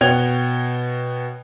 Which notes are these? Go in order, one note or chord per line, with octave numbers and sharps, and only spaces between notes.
B2 F#4 C#5 G5 G#6 F7